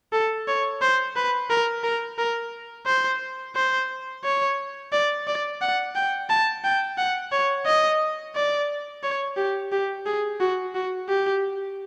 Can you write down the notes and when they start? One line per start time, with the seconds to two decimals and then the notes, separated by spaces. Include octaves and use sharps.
0.13 A4
0.48 C#5
0.82 C5
1.16 B4
1.50 A#4
1.84 A#4
2.18 A#4
2.87 C5
3.56 C5
4.24 C#5
4.92 D5
5.27 D5
5.62 F#5
5.96 G5
6.30 A5
6.64 G5
6.98 F#5
7.32 C#5
7.66 D#5
8.36 D5
9.03 C#5
9.37 G4
9.72 G4
10.06 G#4
10.40 F#4
10.75 F#4
11.09 G4